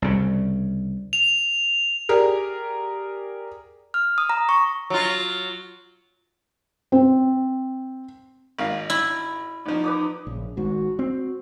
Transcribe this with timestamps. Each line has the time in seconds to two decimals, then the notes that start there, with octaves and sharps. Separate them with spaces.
0.02 C2 C#3
1.13 F7
2.09 G4 G#4 A#4 D5
3.94 F6
4.18 D#6
4.30 A#5
4.49 C#6
4.90 F#3 F4
6.92 C4
8.59 G#1 D#3 F5
8.90 E4
9.65 A1 F3 D#4
9.84 B4 D5 D#6
10.27 A#1 C#3
10.57 G#1 G#2 F#4
10.99 C4 F#4